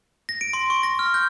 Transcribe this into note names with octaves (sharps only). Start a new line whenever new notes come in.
A#6
D7
C6
C#6
A#6
F6
G6